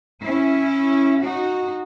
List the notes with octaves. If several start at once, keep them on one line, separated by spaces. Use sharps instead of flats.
C#4 E4
D#4 F#4